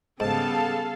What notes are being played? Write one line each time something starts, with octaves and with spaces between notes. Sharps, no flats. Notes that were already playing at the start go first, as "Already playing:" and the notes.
G#2 C#3 G3 B3 G#4 A4 F5 A5